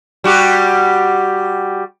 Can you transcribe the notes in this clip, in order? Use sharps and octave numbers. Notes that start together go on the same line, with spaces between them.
G3 F#4 G4